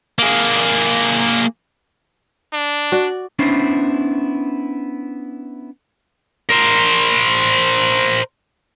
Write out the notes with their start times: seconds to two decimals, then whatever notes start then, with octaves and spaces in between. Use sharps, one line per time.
0.19 A#3 G#4
2.53 D4
2.92 F#4 D5
3.39 B3 C#4 D4 E4 C5
6.49 A#4 C5